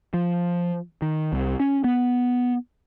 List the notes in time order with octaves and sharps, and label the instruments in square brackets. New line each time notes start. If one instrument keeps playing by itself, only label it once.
[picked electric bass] F3
D#3
C2
C#4
B3